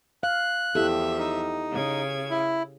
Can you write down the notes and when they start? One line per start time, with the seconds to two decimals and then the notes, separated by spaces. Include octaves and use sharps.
0.23 F5 F#6
0.75 E2 F3 E4 G4 A4 E5
1.19 D#4
1.73 C#3 G#6
2.30 E4